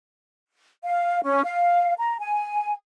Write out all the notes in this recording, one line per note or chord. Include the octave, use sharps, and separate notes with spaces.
F5
C#4
F5
A#5
G#5